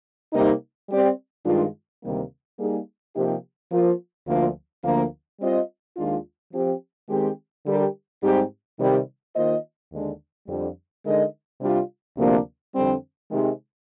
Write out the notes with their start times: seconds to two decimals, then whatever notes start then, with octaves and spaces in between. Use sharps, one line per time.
0.33 C3 G3 A#3 D#4
0.89 G3 C4 G4 D5
1.46 G2 D#3 G#3 D4 F4
2.02 D2 C3 D#3 G3 A#3
2.59 G3 A#3 D#4 G#4
3.15 C3 F3 A#3 D#4 G4
3.72 F3 A#3 F4
4.28 D2 D3 F3 A#3 F4
4.84 D2 D3 F3 A#3
5.40 G3 C4 F4 C5 D#5
5.97 D#2 D#3 G#3 D4 F4
6.53 F3 C4 G4
7.10 D#3 G#3 C4 G4
7.66 D3 G3 D4 G4 A#4
8.23 G#2 G3 C4 D#4 G4
8.79 C3 D#3 G3
9.36 D#3 A#3 F4 C5 D#5
9.92 D#2 D3 G#3 D4
10.48 F2 D3 G3
11.05 D3 G#3 D#4 A#4 D#5
11.61 C3 G3 D4 F4
12.17 D2 C3 F3 A#3 D4
12.74 F2 D3 G3 C4
13.31 C3 D#3 G#3